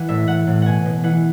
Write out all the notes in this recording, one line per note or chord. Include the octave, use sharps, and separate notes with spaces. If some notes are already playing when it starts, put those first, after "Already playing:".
Already playing: E3 F#5
A2 E5
A2 F#5
A2
B2 F#5 G#5
B2
E3 F#5